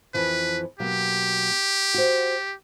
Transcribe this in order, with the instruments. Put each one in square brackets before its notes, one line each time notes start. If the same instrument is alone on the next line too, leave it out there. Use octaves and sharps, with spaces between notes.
[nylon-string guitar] F2 E3 F3 [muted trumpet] B4
[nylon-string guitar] B2 F#3 A#3 [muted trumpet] G4
[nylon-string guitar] F#4 C5